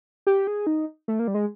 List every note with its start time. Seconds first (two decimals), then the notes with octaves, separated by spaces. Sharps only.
0.27 G4
0.47 G#4
0.67 D#4
1.08 A3
1.19 A#3
1.28 G3
1.34 G#3